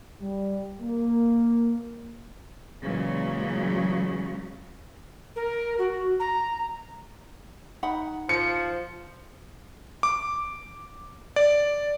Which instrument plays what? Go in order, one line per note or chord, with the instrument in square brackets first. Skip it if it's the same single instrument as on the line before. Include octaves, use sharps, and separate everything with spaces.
[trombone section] G3
A#3
[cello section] A#2 C#3 E3 F#3 G#3
[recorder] A#4
F#4
A#5
[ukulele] D#4 F#5 B5
[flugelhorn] F3 [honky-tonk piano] C#7
[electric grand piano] D6
D5